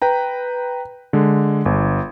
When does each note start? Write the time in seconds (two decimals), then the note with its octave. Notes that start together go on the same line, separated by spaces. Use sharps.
0.02 B4 G5 A#5
1.13 D3 G#3
1.66 G1